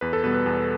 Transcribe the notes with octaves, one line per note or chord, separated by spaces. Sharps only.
E2 B4
A4
B2 G3 B3 B4
B4
E2